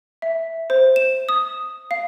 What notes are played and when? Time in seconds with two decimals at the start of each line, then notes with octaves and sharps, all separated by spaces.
0.22 E5
0.70 C5
0.96 E7
1.29 D#6
1.91 F5